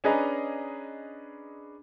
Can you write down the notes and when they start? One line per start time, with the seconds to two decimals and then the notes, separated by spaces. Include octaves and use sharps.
0.04 C#4 D4 G#4 B4 D#5 A#5